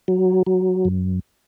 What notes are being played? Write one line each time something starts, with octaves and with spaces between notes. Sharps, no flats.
F#3
F#3
F#2